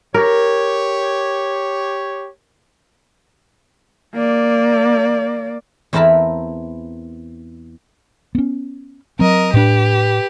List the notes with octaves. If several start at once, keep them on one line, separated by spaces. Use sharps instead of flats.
G4 A#4 C#5
A#3 D5
E2 C4 E4 A#4 A5 B5
B3 C#4
F#3 C4 A#4 D#5
A2 D4 G4 B4